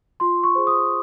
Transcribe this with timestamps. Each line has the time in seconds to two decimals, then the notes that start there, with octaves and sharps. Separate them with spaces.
0.20 F4 C6
0.43 C#6
0.55 G#4 C5
0.67 D#6